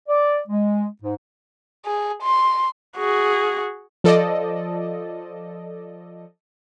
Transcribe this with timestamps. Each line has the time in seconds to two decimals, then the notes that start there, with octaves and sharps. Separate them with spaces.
0.08 D5
0.47 G#3
1.02 G#2
1.86 G#4
2.23 C6
2.97 F#4 G#4
4.04 F3 A4 D5 D#5